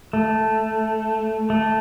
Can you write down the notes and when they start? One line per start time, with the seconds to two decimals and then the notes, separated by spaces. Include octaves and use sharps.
0.13 A3
1.50 A3